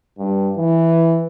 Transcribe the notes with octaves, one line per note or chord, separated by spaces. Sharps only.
G2
E3